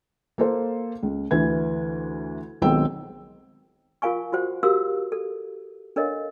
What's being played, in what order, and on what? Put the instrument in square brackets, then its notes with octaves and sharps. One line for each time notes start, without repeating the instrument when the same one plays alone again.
[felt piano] A#3 A4 C5
C#2
D2 E3 B4 G#6
B1 D#3 G#3 C4 G5 E6
[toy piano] F4 A#4 F5 G#5 C#6
F4 F#4 C5 F#5
F#4 G4 A#4 F5 D#6 E6
A4
D4 A4 A#4 C#5 D#5 F5